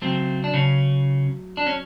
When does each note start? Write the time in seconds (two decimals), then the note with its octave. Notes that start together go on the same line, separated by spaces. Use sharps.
0.02 C#3 F#3 A3 C4
0.44 D4
0.54 C#3 C#4
1.57 D4
1.67 C#4